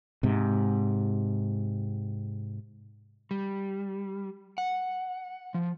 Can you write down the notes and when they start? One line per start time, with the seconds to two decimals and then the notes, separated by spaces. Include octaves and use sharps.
0.23 G#2 C3
3.31 G3
4.58 F#5
5.54 F3